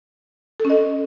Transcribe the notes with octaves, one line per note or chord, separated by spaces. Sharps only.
A4
C#4
D#5